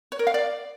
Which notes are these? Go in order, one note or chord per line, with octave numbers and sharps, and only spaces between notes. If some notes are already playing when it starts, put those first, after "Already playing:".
C#5
A#4
F5
D5